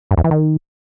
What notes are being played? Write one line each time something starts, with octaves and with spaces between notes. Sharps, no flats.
G2
E2
E3
D#3